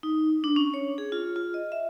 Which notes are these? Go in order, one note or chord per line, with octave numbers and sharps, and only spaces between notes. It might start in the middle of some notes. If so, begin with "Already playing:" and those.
D#4
D4
C#4
C#5
G#4
F4
F4
D#5
E5